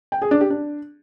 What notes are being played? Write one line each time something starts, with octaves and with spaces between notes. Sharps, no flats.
G5
G#4
D4
G4
D4